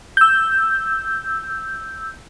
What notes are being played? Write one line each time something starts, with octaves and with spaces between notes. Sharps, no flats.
E6 G6